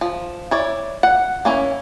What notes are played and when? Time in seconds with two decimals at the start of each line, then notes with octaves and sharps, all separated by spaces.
0.01 F3
0.51 E4 C#5 D5
1.03 F#5
1.45 A#3 C#4 E4